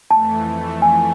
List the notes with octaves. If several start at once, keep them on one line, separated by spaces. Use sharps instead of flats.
F2 E3 A3 A5
G#5